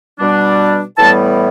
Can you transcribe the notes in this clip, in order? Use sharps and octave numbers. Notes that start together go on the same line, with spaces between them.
B2 G3 D4
A2 E3 G3 B3 A5